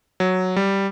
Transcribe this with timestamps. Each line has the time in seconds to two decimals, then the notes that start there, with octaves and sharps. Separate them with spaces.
0.20 F#3
0.56 G3